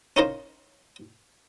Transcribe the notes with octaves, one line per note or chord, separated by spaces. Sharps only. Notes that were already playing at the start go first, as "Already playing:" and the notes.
C#4 D#4 F4 A#4 C5